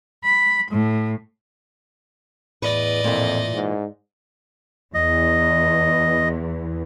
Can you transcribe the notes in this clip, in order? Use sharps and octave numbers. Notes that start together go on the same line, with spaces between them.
B5
A2
E2 A2 B4 D5 D#5
F2 A#2 E3
G#2
E2 D#5